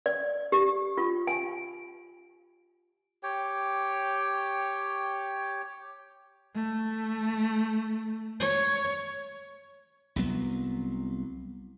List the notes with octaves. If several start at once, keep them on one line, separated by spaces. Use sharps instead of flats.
D5
G4
F4
G#5
G4 C#5 G5
A3
C#5
C2 F#3 B3